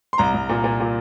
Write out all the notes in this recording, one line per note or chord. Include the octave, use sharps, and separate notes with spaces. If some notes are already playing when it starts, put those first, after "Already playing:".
C6
C2 A#5
C2
A#2
A#2
A#2